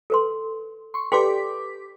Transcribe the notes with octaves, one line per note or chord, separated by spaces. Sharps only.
A4 B4 C6
C6 C#6
G4 A4 B4 D5 G5 C6 D6 B6